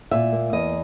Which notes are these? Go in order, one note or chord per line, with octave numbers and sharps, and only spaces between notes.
A#2 E5
A#3
E2 D#5